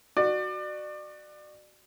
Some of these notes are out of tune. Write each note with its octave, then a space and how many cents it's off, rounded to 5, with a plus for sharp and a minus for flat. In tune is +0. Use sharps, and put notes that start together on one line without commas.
F#4 +5 D5 +30